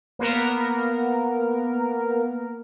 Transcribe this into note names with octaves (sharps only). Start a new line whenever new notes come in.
A#3 B3 A#4